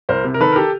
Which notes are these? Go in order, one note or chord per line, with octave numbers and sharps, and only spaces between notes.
C2 A#4 C5
C3
A#4
D#3 A4 B4
A#4
G4 A4